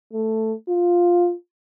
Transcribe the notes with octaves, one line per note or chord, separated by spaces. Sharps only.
A3
F4